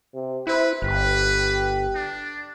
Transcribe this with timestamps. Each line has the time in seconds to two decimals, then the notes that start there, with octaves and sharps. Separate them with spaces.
0.14 C3
0.47 E4 B4 C5
0.82 G1 G4 B4
1.95 D4